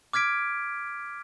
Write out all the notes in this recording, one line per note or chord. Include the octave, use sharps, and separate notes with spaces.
D6 F6 G#6 B6 D7